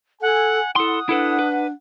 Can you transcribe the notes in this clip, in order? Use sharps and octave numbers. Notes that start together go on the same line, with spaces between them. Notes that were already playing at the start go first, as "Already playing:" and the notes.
A4 F#5 G#5
E4 A4 F#5 C6 D#6
D4 E4 A4 B4
B4